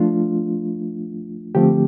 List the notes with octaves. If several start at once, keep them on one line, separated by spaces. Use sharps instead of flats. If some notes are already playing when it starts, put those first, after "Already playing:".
Already playing: F3 A3 D4 F4
D3 F3 A3 C4 G4